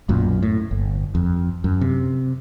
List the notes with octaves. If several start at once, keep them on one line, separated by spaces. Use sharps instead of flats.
B1 F#2 A#2
A2
G1
F2
F#2
C3